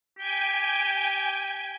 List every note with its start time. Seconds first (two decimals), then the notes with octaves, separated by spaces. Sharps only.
0.18 G4 G5 G#5